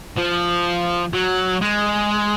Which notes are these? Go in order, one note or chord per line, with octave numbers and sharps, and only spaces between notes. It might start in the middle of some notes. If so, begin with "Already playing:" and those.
F3
F#3
G#3